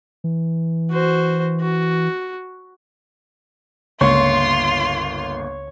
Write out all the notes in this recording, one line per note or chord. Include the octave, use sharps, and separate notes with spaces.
E3
F#4 C5
F#4
G1 C#2 A#3 F4 C#5 C6